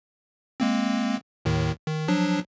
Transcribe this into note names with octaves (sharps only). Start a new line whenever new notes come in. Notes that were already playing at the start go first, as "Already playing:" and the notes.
G#3 A#3 C4
D#2 A2 D#3
D#3
F3 F#3 D4